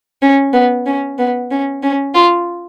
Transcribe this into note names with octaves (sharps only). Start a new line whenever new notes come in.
C#4
B3
C#4
B3
C#4
C#4
F4